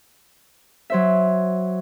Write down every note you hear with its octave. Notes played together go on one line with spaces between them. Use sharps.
F#3 C5 E5